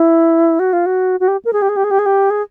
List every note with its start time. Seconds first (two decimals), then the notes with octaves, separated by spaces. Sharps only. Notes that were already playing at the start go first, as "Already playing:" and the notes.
Already playing: E4
0.59 F#4
0.73 F4
0.86 F#4
1.20 F#4
1.28 G4
1.45 A#4
1.53 G#4
1.62 G4
1.69 G#4
1.76 G4
1.84 G#4
1.91 G4
1.99 G#4
2.06 G4
2.30 G#4